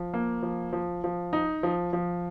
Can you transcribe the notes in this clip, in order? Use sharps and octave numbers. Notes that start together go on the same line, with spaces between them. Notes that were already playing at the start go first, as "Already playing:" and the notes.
Already playing: F3
A#3
F3
F3
F3
D#4
F3
F3